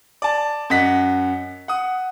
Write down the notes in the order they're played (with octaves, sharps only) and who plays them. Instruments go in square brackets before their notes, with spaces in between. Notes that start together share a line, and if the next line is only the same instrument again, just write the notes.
[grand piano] D5 A5
F#2 D#5 F#5 B6
F#5 D#6